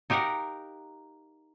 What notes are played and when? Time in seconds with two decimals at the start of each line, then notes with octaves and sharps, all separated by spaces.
0.10 D#4 G4 A#4 F5 F#5